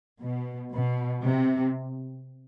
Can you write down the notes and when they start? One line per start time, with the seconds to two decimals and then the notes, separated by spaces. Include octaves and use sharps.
0.20 B2
0.72 B2
1.25 C3